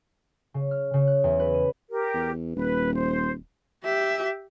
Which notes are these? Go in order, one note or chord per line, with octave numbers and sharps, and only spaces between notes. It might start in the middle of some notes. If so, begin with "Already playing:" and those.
C#3
F6
C#3
F#6
E2
B4
D#7
G4 A#4
E2
D#1 B4
C5
G4 E5